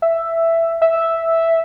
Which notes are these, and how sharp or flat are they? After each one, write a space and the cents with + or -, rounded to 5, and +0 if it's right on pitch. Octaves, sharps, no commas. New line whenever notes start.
E5 +5
E5 -5